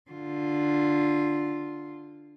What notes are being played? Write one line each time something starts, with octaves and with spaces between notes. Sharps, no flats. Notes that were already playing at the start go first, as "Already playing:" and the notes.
D3 F4